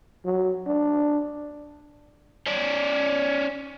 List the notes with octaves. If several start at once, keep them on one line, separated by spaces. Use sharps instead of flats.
F#3
D4
C#4 D5